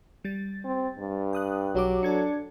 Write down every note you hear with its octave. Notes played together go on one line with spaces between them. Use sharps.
G3 A6
C4
G2
G5 D#6 F#6
B1 F#3 G4 D6
D4 A4 G#6 C#7